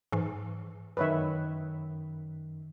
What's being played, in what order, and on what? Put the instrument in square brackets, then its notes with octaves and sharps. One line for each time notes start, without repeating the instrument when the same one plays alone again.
[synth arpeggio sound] G#2 E3
[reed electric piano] F#2 D#3 [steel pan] B4 C#5 E5